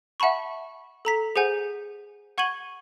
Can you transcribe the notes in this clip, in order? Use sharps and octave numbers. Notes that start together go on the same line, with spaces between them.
E5 F#5 A5 B5 C#6
A4 A#5 B6
G#4 C5 F#5 G#5 G6
F#5 C#6 G#6 D#7 F#7 G7